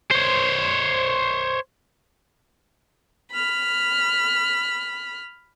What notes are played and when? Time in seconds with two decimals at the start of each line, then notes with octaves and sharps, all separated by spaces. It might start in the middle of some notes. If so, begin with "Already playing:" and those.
0.11 C5 C#5
3.32 B5 F6